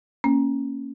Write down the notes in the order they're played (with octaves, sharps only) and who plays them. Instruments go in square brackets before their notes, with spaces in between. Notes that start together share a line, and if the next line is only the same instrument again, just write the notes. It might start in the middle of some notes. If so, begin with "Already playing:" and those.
[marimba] A#3 C#4